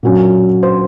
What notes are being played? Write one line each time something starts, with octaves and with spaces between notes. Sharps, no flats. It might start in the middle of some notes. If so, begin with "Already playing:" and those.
A#2 F#3 C#4
C5